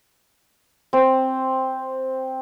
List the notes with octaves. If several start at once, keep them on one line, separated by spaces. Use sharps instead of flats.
C4